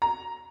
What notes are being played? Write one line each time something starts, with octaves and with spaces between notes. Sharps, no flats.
A#5